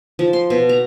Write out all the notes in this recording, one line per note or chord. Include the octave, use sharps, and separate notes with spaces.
F3
C6
B2
A#5